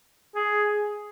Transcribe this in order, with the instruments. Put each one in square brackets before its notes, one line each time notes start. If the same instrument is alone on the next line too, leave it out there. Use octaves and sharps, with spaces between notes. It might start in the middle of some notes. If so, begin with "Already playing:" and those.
[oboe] G#4